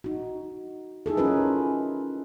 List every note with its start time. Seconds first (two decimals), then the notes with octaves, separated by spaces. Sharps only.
0.04 D#4 F#4
1.06 D#4 E4 G#4 A4
1.17 C#4 D#4 F4 G#4 A#4 B4